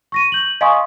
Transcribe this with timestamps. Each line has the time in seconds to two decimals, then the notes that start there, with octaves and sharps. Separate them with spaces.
0.12 C#6 A#6 D#7
0.32 G6 F#7
0.61 D#5 F5 G#5 C6 C#6 D#6